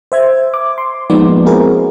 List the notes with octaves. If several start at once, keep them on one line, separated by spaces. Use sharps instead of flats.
C5 E5 G#6
D6
C6
F3 G#3 A#3 B3 D#4 D5
C4 E4 F#4 G#4 A#4